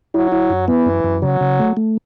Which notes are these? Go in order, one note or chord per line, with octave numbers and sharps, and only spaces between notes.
F#3 E4
E4
F#2
E3 B3
F#2
F#2
C#3 F#3
C#3
A3
A3